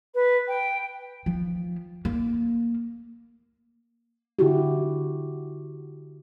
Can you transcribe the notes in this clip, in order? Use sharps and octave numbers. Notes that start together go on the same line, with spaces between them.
B4
G5
F3
A#3
D3 E4 F#4 G4